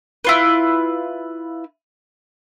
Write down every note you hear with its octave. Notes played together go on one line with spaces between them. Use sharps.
E4 F4 B4